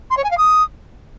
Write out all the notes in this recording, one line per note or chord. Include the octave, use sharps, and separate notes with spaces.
C6
C#5
G#5
F5
D#6